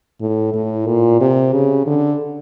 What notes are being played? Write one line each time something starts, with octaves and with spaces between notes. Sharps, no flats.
A2
A2
A#2
C3
C#3
D3